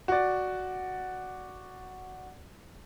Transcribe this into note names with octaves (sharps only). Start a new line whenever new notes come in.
F#4 D5